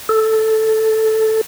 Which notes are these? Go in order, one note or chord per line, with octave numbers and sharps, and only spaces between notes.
A4